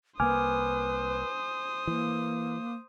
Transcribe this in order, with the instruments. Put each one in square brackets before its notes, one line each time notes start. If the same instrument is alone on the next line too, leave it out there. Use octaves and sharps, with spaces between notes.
[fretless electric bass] C2 A#3 [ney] B4 [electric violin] C5 D#6 [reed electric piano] G#5 D6 F6
[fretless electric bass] E3 [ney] A#3